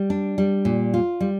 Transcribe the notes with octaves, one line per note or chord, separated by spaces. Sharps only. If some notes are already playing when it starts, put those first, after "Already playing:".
Already playing: G3
D4
G3
A#2
F4
G3